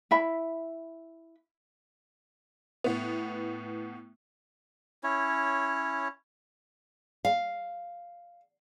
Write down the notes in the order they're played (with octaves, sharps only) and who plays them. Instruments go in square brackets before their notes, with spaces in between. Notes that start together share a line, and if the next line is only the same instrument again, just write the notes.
[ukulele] E4 E5 B5
[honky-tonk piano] A2 B3
[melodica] C#4 E4 C#5
[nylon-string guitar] F5